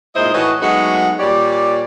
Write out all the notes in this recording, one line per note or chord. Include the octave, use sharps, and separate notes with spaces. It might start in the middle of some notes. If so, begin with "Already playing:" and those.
A#2 G#3 D#4 E4 C5 D#5
A2 E3 F#4 C#5 D#5
F#3 G#3 A3 B3 D#4 F#4
A#2 G3 G4 C#5 D5